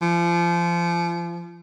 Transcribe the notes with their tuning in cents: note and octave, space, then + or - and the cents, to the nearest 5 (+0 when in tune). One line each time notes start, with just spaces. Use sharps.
F3 -30